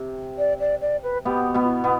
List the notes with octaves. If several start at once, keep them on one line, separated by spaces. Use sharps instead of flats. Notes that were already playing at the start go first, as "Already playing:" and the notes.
Already playing: C3
D5
D5
D5
B4
B2 B3 G4
B2 B3
F4
E4
B2 B3